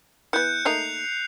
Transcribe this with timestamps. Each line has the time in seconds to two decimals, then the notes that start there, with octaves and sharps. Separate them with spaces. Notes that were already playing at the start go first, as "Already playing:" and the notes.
0.33 E3 B3 F#6 G6 C#7
0.65 A3 A#3 D#4 G6 C7 F7